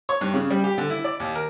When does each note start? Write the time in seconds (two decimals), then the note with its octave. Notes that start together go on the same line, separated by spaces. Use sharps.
0.09 C#5
0.21 G2
0.34 C#3
0.50 G3
0.64 G4
0.78 D3
0.90 E4
1.04 D5
1.20 D#2
1.35 A#4